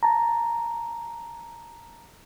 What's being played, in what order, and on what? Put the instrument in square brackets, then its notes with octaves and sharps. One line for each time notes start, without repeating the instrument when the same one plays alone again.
[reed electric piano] A5 A#5